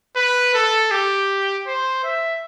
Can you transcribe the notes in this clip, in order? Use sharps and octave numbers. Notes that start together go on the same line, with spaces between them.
B4
A4
G4
C5
E5